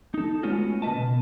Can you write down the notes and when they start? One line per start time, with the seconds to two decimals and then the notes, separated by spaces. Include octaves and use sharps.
0.14 D#4 A4
0.43 G#3 A3 B3 C#4 F4 F#4
0.82 C#3 A#3 B4 D#5 A5
0.96 B2